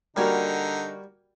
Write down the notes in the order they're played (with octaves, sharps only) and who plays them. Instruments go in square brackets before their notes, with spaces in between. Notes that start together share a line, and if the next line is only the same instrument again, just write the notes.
[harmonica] D3 D#4 [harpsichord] G3 G#5 [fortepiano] A#3 F#4 A#4